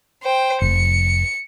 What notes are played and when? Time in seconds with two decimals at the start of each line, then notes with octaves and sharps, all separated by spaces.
0.23 C5 G5
0.62 F1 C#7